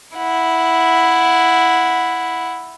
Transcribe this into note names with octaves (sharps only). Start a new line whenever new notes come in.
E4 F#5